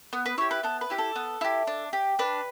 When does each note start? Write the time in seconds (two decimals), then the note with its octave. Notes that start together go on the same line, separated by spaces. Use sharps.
0.13 B3
0.26 B4
0.38 E4 G4 C#5
0.51 B4
0.63 B3 A4
0.81 B4
0.90 E4 G4
0.98 A4
1.16 B3
1.41 E4 G4
1.67 D4
1.93 G4
2.19 D4 B4